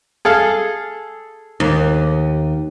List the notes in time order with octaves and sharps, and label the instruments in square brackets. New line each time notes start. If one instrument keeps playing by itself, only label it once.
[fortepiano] G#4 A4 F5
[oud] D#2